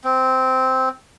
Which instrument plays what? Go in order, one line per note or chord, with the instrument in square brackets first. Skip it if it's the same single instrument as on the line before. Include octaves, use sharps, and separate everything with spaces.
[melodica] C4